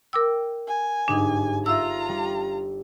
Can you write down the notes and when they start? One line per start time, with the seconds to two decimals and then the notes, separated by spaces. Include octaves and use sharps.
0.13 A#4 G5 D6 E6
0.67 G#5
1.08 G1 G#2 D4 D#4 G#6
1.66 F4 A4 E5 A#5 E6
2.09 G3